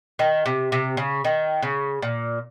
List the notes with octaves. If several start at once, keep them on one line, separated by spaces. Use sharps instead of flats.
D#3
C3
C3
C#3
D#3
C#3
A#2